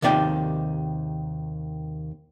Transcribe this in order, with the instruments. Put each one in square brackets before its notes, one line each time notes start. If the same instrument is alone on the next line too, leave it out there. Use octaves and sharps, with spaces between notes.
[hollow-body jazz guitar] D#2 C3 D#3 D5 G5